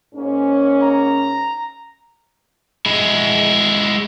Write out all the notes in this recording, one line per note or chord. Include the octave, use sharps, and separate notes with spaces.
G#2 A#3 C#4
A#5
G#3 E4